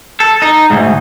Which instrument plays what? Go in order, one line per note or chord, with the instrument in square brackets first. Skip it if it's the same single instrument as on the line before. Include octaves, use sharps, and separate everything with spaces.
[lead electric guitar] A4
D#4
D2 G#2